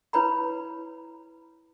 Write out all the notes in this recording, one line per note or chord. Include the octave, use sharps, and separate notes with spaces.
E4 B4 C#5 A#5 B5